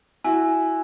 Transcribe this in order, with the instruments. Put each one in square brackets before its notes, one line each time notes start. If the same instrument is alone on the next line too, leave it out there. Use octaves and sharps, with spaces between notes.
[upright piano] E4 F#4 [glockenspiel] G#5